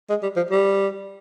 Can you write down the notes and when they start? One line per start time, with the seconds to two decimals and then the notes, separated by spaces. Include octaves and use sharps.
0.10 G#3
0.23 G3
0.37 F3
0.51 G3